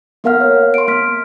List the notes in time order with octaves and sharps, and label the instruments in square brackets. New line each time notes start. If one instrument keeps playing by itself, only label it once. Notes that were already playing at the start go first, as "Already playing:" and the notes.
[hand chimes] A#3 B3 A#4 F5 F#5 F6
C#5
C6 D7
A#3 F6 B6